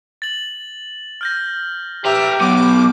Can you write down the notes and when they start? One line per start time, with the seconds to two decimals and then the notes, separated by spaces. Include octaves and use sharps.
0.22 A6 F#7
1.21 F6 G6 A#6
2.05 G4 B4 E5 A#5
2.40 F#3 B3 D6